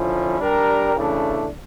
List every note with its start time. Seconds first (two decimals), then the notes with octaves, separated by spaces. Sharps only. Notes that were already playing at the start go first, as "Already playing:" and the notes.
Already playing: D3 F3 C#4 E4
0.40 G3 D4 G4 A#4
0.96 C#3 E3 A3 D4